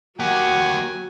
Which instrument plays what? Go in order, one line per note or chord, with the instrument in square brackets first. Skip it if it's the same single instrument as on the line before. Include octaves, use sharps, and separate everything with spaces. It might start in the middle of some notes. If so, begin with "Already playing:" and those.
[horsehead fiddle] F#3 [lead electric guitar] A#3 G4 [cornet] F#5 [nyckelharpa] G#5